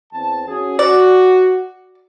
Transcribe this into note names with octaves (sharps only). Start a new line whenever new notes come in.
E2 C4 A5
C#4 F#4 G#4
F#4 D5